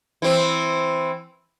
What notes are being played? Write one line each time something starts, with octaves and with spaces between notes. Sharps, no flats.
E3 C4